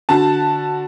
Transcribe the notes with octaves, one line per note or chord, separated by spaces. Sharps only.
D3 F#4 A5